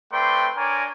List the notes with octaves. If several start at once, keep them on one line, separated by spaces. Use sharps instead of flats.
A3 C4 B4 D5 G5 C6
D4 A#4 C#5 D5 G#5 A#5